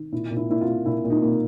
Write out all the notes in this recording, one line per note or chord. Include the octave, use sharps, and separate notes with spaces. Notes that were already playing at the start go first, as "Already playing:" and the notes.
Already playing: D#3
A#2 E4
A#2
E4
A#3 E4
F4
A#3
A#2 E4
A#2
D#4
A#3